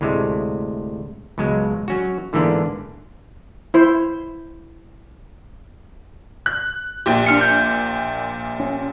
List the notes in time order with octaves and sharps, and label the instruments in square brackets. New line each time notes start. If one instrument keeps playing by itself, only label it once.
[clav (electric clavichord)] D2 A2 C3 G#3
C#2 B2 F#3 G#3
F#3 C#4 F#4
G#2 D3 E3 A#3 B3 D4
[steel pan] E4 C5
[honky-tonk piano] F#6
A#1 A#2 G4
[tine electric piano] D4 F6 C#7
G6
C#4